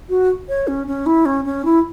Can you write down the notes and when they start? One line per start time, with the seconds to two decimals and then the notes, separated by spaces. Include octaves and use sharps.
0.09 F#4
0.49 C#5
0.68 C#4
0.87 C#4
1.06 E4
1.26 C#4
1.45 C#4
1.65 E4